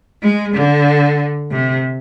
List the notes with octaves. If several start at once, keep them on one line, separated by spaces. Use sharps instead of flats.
G#3
D3
C3